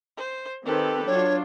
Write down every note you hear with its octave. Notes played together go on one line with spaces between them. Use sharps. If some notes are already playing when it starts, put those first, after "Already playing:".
C5
D#3 C4 G4 A4 B4
F#3 D4 F4 C#5